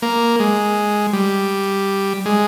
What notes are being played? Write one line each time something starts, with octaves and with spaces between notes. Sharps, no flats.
A#3
G#3
G3
G#3